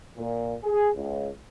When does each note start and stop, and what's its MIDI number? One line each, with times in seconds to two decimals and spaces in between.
0.17 0.56 46
0.64 0.91 68
0.95 1.28 37